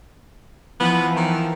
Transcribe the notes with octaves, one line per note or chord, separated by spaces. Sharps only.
E3 F3 B3
D#3